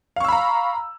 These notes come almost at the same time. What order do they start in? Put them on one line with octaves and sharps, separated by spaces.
F5 C#6 E6 B5 A#5